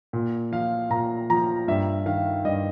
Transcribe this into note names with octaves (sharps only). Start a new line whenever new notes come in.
A#2
F3 F5
A#2 A#5
F3 A#5
G2 E5
D#3 F5
G2 D#5